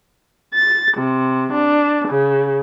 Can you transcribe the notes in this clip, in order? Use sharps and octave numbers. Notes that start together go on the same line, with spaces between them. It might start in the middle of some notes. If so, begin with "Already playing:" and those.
A6
C3
D4
C#3